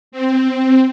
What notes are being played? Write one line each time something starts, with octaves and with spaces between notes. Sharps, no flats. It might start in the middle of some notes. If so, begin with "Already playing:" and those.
C4